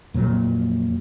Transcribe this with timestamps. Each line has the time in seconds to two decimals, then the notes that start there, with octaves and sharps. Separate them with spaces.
0.14 F2 A#2 F#3